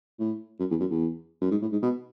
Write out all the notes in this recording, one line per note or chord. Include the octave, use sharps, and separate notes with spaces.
A2
F#2
E2
F#2
E2
F#2
G#2
A2
G#2
B2